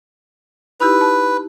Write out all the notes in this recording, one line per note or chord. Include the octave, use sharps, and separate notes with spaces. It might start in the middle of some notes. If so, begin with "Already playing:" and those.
D#4 E4 G4 B4
A5